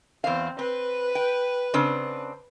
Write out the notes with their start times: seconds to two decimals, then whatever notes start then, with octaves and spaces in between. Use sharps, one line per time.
0.24 E2 C4 F5
0.59 C4 B4
1.15 G5
1.74 C#3 C4 D4